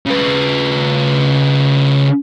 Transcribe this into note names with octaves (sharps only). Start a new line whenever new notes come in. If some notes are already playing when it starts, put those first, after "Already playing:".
C#3 B4